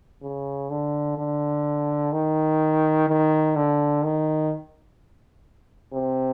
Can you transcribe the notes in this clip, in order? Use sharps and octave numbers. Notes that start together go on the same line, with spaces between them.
C#3
D3
D3
D#3
D#3
D3
D#3
C3